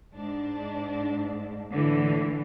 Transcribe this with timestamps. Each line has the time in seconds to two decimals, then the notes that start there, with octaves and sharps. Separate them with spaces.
0.13 G#2 D4
1.71 A2 D3 E3